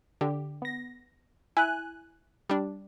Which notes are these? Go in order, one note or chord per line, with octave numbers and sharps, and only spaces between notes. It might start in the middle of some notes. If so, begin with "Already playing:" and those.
D3 G4
B3 A#6
E4 G#5 F#6
G3 D4